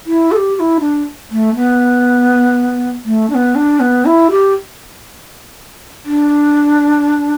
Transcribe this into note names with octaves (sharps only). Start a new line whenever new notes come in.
E4
A4
G4
G4
E4
D4
A3
B3
A3
D4
B3
D4
B3
E4
G4
D4